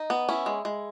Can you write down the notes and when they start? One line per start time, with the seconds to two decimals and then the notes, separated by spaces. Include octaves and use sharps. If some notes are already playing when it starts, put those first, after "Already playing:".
Already playing: D#4
0.10 B3
0.29 C#4 E4
0.46 G#3
0.65 G#3